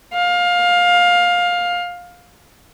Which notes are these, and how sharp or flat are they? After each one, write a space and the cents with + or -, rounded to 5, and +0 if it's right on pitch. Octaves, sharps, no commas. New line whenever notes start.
F5 +20